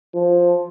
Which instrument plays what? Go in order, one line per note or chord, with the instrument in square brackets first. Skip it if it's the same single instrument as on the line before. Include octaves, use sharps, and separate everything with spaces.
[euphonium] F3